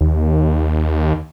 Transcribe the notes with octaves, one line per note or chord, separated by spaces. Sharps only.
D#2